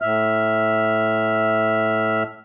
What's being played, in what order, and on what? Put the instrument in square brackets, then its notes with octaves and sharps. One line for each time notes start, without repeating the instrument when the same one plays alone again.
[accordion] A2 E5 F6